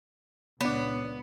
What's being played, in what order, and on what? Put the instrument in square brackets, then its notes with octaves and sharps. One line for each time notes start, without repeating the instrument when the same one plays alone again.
[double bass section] C#2 A#2 [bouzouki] B3 [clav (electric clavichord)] D4 C#5